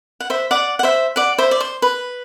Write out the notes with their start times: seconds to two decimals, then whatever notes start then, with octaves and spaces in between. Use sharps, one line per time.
0.20 F#5
0.30 C5 E5
0.51 D5 F#5
0.79 F#5
0.83 C5 E5
1.16 D5 F#5
1.38 C5 E5
1.51 D5
1.61 C5
1.82 B4